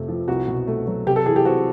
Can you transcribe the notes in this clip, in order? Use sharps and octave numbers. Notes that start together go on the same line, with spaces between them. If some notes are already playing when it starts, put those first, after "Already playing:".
Already playing: F2 C3 A3
F3
C2 F#4
B2
A3
F#3
C3 G4
A4
E3 G#4
G4
C4 F#4